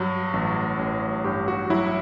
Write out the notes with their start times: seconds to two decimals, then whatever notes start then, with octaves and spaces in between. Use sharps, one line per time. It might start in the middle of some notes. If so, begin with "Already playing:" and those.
Already playing: G2 F#3
0.33 A1
0.79 A1
1.24 G2 G4
1.48 F#4
1.70 F#3 E4